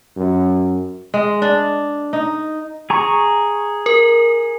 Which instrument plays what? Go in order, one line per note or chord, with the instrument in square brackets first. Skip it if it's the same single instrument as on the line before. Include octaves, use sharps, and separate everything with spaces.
[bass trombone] F#2
[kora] G#3
D4
D#4
[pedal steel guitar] G#4 A#5 C#6
[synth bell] A#4